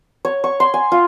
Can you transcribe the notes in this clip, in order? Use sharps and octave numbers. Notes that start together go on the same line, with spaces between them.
C#5
C#6
C6
G#5
F4